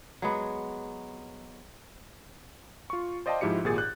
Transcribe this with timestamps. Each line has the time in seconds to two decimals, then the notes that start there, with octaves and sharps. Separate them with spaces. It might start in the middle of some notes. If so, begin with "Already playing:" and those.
0.22 F#3 G#3 B3
2.90 F4 C#6
3.26 C5 D5 D#5 F5 G5 A5
3.41 G#2 F3 E4 G4 C#7
3.64 G#1 A#2 G4 G#4 A6
3.78 F#6 G6